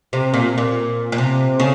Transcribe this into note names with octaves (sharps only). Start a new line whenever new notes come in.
C3
A#2
A#2
A#2
C3
C#3